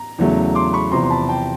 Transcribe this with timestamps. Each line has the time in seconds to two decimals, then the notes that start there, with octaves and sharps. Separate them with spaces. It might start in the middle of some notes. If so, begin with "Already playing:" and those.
Already playing: A#5
0.18 E2 C#3 F#3 A3
0.55 C6 D6
0.73 B5 C#6
0.92 E2 C3 F3 A#5 C6
1.03 C6
1.10 A5 B5
1.29 G5 A5